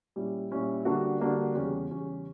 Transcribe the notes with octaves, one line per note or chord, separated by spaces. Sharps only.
A#2 G3 C#4 E4
A#2 G3 C#4 E4
D3 G3 A#3 D4 F#4
D3 G3 A#3 D4 F#4
E2 C#3 G3 C#4 G4
E2 C#3 G3 C#4 G4